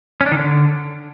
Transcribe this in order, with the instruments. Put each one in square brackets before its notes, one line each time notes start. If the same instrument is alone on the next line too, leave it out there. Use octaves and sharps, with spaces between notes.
[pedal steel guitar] C#4
D4
D#3
D3